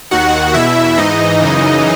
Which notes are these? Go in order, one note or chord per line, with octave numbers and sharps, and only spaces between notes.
D#2 D#3 F#4 F#5
E2 B2 E4 E5
G#2 E3 D#4 D#5
F#2 C#3 E3